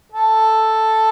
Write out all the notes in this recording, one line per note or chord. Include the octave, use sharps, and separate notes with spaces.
A4